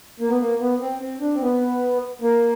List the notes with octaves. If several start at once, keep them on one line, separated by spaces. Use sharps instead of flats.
A#3
B3
A#3
B3
C4
C4
D4
C4
B3
A#3